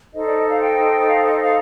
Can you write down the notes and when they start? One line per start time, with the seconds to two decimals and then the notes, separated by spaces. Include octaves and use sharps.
0.13 D#4 A4 C5 D#5
0.25 D5
0.37 D#5
0.49 F5
0.61 G5
1.07 F5
1.24 D#5
1.39 F5